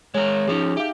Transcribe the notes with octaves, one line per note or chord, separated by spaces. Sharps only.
G#3 A#4 C#5
F3 C#4 D#4 G#4
G4 E5 F5